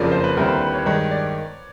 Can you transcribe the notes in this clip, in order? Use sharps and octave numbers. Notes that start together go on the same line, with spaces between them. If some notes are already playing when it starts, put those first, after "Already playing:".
Already playing: F#1 F2 C#3 F3 A#3 D5
C5
B4
D#2 D3 G3 C4 E4 A#4
B4
B4
C#5
G2 D#3 G#3 C#5
D5